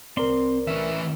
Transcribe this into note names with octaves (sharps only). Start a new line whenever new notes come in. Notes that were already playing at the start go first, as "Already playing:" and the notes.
C2 C4 A#4 D5 C6
E3 C#4 E5